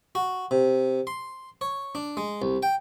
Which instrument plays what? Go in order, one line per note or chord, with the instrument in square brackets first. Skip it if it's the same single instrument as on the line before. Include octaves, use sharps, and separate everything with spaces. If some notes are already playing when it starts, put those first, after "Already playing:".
[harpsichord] F#4
C3
C6
C#5
D4
G#3
C2
G5